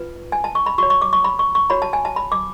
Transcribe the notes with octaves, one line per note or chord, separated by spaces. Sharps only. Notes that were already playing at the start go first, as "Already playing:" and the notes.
Already playing: F4 B4
G#5
A5
C#6
B5
F#4 C#5 C#6
C#6
D6
C#6
B5
C#6
C#6
F#4 C#5 B5
A5
G#5
A5
B5
D6